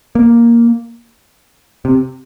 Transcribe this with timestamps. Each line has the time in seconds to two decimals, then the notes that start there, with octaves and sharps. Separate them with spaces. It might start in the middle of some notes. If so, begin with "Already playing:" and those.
0.15 A#3
1.85 C3